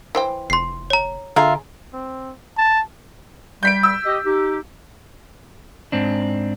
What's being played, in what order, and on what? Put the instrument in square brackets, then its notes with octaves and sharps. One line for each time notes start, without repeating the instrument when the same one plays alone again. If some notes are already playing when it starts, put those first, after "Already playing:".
[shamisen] E3 C5 G5
[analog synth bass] F1 [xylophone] C6 C7
[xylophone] C#5 A#5
[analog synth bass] D3 [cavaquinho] F4 A#4 E5 [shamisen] G#4
[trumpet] C4
A5
[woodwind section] G3 [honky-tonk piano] G6 B6 D7
[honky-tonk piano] E6
[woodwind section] G4 D#5
D#4 G4
[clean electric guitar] G#2 C4 D4